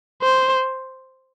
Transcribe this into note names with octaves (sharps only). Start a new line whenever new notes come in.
C5